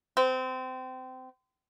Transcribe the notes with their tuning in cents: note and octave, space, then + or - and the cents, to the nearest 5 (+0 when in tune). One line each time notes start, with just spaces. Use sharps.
C4 -25